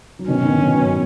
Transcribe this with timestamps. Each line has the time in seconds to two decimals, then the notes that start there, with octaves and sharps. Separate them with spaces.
0.19 F#3
0.28 B2 D#3 C#4
0.43 B2 D#3
0.57 B2 D#3
0.72 F#3 B3